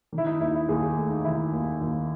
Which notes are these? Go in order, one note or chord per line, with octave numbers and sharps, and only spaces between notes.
D#3
E4
D#4
D#2 E4
E4
D#2 G#4
G#4
A3
D#4
D#3 E4
D#2
D#2